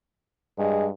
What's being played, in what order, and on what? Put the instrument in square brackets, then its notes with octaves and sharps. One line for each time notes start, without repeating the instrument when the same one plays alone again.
[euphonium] G2 [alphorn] G#3